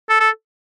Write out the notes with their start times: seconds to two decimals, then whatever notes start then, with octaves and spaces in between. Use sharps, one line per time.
0.09 A4
0.20 A4